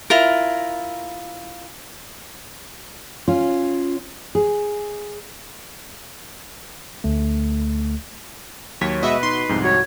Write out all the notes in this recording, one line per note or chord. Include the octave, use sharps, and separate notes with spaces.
E4 F4 A#4
C#4 F4
G#4
D2 A3
D#2 F#3 C#5 B6
B2 G#3 F#4 B4 D#5 E5 F#5
D#4 C6
C2 F2 G#2
F#4 C#5